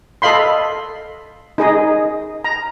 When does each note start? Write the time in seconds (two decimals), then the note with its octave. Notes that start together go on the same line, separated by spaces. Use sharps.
0.22 A4 D#5 F5 B5 C6
1.58 D#4 G#4 D#5
2.44 A#5